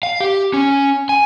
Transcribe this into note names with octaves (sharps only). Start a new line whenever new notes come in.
F5
G4
C#4
G#5